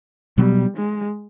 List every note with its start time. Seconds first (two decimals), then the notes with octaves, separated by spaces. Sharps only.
0.38 B2 F#3 G3 B3
0.77 G#3